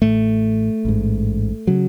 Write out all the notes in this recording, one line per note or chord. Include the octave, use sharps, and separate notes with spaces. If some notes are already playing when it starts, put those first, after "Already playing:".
A1 A2 A3
A1 G#2
C#3 F#3